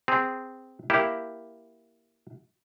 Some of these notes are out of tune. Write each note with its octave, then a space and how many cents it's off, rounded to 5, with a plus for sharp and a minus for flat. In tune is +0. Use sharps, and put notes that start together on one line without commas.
C4 -10 G#4 -10 A#5 +0
A#3 +5 E4 +0 G4 +0